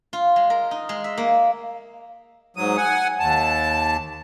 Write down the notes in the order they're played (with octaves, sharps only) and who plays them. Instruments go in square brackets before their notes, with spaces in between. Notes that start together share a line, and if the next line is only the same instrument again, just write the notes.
[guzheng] F4
G#3
A#4
D#4
G#3
E5
A#3
[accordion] G#2 F#3 D#6
F#5 G#5
D#2 A5